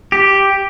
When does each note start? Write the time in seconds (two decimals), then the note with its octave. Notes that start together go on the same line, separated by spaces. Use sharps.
0.12 G4